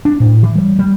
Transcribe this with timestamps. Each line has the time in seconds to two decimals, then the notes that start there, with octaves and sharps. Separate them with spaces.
0.05 D4
0.20 A2
0.43 E3
0.56 G3
0.79 G3